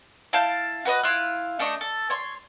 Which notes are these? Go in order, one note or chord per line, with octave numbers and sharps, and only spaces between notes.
E4 F5 A5 G6
F#4 B4 C#5 D#5
E4 F4 F#6
A3 D4 D#5 C#6
A4
C#5 C6